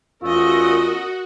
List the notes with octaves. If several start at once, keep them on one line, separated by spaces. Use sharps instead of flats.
E2 A3 C#4 F4 F#4 A#4 D#5